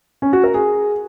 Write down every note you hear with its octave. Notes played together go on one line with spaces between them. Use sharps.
C#4
F#4
A#4
G#4